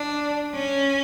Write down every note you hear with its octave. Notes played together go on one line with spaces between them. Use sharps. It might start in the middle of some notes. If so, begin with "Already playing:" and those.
Already playing: D4
C#4